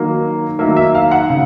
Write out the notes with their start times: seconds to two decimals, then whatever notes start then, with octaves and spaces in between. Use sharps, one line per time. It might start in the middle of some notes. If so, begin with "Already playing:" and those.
Already playing: D#3 F#3 A#3
0.59 D#3 F#3 A#3 E5
0.77 E5
0.95 F5
1.11 F#5
1.30 C#3